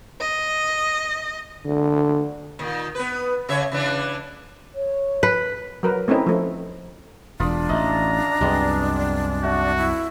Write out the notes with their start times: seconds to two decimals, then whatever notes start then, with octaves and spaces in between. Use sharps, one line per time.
0.21 D#5
1.66 D3
2.59 A#2 D#3
2.95 B3 B4
3.49 C#3 C#5 E5
3.72 C#3 E3 D4
4.75 C#5
5.23 B4
5.83 F#3 A#4 B4
6.08 A3 C4 C#4 D#4 E4
6.26 F3 A3
7.40 E1 D4 F4 B5 D#6
7.69 A1 A3 D#5 A#5
8.41 C2 F#2 G3 G#3 B3
9.44 A3 F#4
9.77 E4